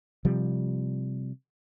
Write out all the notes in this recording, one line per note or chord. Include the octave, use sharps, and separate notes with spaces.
C3 F3 G3